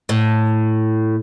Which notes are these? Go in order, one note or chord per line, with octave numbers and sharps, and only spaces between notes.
A2